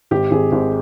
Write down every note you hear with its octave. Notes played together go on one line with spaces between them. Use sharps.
G#1 G4
G#1 G#4
G#1